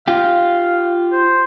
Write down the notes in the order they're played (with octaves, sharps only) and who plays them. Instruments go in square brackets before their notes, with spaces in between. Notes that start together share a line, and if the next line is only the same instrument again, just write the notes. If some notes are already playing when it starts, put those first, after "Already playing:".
[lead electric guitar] F4 G4 [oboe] F5
[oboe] C5